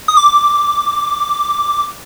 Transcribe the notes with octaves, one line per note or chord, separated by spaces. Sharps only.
D#6
D6